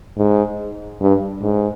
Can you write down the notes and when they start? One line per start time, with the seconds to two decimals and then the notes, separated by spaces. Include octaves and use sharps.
0.17 G#2
1.01 G2
1.42 G#2